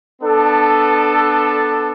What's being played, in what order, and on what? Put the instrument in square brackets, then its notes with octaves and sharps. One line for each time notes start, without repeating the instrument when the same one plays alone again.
[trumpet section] B3 D4 A4